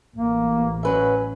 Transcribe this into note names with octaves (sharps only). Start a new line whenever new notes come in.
A1 A#3
F#3 C#4 B4 E5